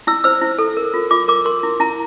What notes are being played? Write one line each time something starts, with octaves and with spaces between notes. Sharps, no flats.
E4 E6
C5 E6
E4
A4
A#4
F4
F4 D6
A#4 D6
A#4 C6
E4
E4 A#5